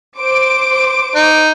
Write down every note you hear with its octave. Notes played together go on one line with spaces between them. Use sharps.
C5 D6 D7
D#4